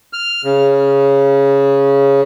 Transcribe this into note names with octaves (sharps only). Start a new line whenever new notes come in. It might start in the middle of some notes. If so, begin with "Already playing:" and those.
F6
C#3